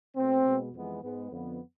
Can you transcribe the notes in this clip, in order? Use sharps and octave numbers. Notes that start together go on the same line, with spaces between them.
B2 A3 C4
B2 G#3 B3
F2 E3 G#3 B3
G#2 G#3 B3
F2 D3 F3 B3